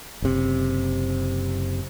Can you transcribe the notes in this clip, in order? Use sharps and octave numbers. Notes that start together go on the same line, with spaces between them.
F#1 C3